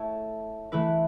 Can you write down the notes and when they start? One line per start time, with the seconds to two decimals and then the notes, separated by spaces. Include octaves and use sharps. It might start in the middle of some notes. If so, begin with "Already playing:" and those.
Already playing: A3 E4 A4 C#5
0.72 E3 A3 E4 B4